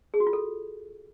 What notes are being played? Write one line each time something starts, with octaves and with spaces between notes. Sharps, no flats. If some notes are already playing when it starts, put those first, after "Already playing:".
G#4
F#4
F4
A4